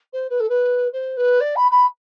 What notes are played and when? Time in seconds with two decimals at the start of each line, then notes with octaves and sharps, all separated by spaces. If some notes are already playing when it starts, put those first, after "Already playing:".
0.13 C5
0.30 B4
0.40 A4
0.49 B4
0.93 C5
1.17 B4
1.40 D5
1.56 B5
1.71 B5